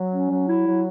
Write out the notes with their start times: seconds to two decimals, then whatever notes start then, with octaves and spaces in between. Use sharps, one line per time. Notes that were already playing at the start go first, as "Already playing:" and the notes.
Already playing: F#3
0.12 C#4
0.30 F#3
0.48 E4
0.66 F#3